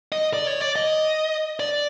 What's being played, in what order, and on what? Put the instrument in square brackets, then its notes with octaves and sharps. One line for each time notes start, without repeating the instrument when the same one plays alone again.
[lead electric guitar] D#5
D5
C#5
D5
D#5
D5